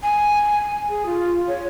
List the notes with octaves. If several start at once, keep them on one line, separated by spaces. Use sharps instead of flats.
G#5
G#4
F4
C#5